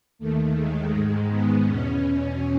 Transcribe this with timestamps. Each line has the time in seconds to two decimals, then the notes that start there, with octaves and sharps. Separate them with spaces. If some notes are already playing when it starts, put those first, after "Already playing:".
0.19 D#2 D#3 A3
0.55 G#3
0.92 G#2 D#3 G#3
1.30 B3
1.66 E2 B2 C#4
2.02 C#4